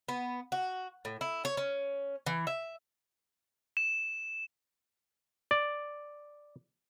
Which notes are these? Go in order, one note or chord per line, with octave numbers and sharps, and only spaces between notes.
B3
F#4
A2
E4
C#5
C#4
E3
E5
E7
D5